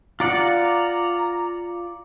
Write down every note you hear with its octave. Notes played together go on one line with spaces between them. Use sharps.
F4 D5 F#5 A#5